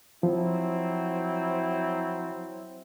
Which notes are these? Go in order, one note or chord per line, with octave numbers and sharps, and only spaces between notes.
F3 F#3 C4 E4